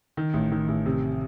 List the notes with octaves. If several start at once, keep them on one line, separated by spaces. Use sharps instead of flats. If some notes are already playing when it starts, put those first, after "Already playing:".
D#3
A1
D#3
A1
C3